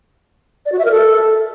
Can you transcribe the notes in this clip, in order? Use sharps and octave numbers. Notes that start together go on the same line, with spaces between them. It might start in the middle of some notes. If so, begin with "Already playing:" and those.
D5
F#4
E5
A#4
A4